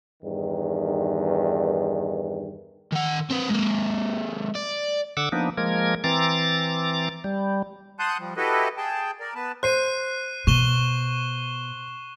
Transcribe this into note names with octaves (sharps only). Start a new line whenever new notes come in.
E2 G2 D#3
D#3 F#5
C4 B4
G#3 A#3
D5
D3 F#5 D6 E6
F3 A#3 B3 D4 D#4
F3 G#3 A#3 A#4 G#6
E3 C4 A#5 D6 A6
G3
F#5 A5 C6 D#6 F#6 G6
F3 G3
E4 F#4 G4 A4 B4 D#5
G#4 G5 A5
A#4 D5
B3 B4 A5
C5 F#6 C7 D#7
B2 C#6 E7 G7